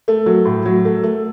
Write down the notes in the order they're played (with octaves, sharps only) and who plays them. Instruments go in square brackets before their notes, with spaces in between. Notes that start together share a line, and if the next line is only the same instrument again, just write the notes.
[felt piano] A3
F#3
A2
F#3
A3
A3